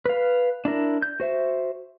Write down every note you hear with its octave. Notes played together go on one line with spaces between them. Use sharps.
B4 F5
D4 E4 A#4
G6
F#4 C5 E5